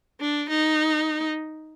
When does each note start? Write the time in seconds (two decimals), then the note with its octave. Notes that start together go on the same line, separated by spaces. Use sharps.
0.21 D4
0.49 D#4